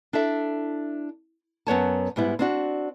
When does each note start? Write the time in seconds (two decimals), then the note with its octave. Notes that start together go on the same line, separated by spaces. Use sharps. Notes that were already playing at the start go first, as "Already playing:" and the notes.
0.13 D4 E4 A4 E5
1.67 F#2 B3 C#5 A5
2.16 G#2 G3 B3 E4
2.39 C4 D4 F#4